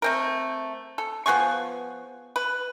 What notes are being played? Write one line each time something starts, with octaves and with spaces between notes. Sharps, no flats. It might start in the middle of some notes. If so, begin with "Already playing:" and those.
A3 C4 A#4
A4
F3 B3 G#4 C#6
B4